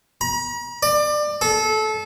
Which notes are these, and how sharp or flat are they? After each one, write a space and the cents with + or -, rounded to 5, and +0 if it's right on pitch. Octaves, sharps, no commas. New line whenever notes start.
A#5 +45
D5 +25
A4 -25